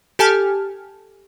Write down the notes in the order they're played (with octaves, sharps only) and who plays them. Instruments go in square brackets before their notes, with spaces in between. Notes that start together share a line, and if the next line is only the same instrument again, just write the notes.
[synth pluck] G4 A4 G#5 A5 F6